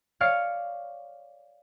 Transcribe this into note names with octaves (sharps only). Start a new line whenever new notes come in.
C#5 D5 F5 F6 C#7